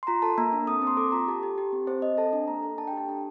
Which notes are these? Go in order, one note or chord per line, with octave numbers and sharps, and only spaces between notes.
C6
F4 A#5
A4 A5
A#3 A#5
D4
C4 D#6
C4
C6
A4 D6
F4 A#5
G4 A5
G4
G4
C4
C4 C5
C4 D#5
A4 A5
D4
A#3 A#5
A4 A#5
D4 A5
G5
G4 A5
D4 A5